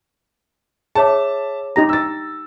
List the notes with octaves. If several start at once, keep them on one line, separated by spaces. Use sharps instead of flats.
G#4 C#5 E5 A5 D6
D#4 G4 A#5 A#6
E6 A6